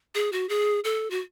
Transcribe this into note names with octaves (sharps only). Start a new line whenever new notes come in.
G#4
F#4
G#4
A4
F#4